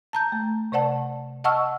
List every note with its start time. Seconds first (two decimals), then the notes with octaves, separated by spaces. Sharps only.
0.13 A5 A#5 G6
0.32 A3
0.72 C3 C5 D5 F#5 A5
1.44 D#5 F#5 A5 C#6 E6 F6